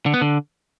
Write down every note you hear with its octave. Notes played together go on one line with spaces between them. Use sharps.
D3
B3
D3